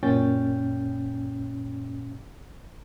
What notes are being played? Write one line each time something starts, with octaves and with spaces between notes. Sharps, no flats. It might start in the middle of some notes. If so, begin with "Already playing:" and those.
F#2 A#2 C#4 G5 G6 A6